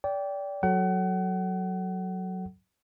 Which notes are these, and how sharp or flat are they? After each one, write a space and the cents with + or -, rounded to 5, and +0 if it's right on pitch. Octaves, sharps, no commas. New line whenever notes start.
D5 -25 G5 +0
F#3 +0 A4 +0 F#5 +35